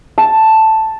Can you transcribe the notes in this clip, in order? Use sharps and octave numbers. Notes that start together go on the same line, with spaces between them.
A5